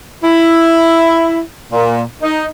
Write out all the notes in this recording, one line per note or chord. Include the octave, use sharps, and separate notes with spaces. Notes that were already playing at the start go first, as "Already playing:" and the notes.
E4
A#2
D#4